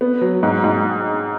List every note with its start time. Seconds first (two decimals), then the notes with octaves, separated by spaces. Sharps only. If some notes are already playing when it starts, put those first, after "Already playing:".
0.01 B3
0.21 F#3
0.43 G#2
0.64 G#2